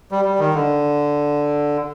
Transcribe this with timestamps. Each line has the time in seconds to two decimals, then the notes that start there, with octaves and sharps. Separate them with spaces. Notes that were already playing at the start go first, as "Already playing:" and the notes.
0.11 G3
0.25 G3
0.39 D#3
0.54 D3